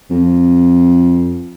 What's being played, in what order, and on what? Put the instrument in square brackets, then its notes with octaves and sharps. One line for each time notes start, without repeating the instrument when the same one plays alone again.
[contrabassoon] F2